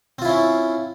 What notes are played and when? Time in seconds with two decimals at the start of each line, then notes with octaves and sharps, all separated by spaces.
0.19 C4
0.22 F4
0.25 E4
0.28 C#4